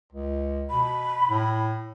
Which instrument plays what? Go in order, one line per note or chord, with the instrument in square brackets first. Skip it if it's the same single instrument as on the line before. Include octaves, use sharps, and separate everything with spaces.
[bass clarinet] C#2
[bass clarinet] B2 [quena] B5
[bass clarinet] A2